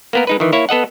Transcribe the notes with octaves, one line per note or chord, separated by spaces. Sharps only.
A#3 B3 A#4
G#3 D#4 B4
D#3 E3
A#3 E4 C#5
B3 A4 D#5 F#5